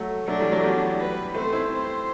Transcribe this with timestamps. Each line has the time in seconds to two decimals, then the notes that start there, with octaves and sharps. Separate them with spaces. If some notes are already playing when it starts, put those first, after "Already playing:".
Already playing: F#3 A3
0.28 F#3 A3 D4
0.40 E3 G3
0.52 F#3 A3
0.63 G3 B3
1.00 B4
1.35 A3 C4 C5
1.53 C4 E4
1.71 C5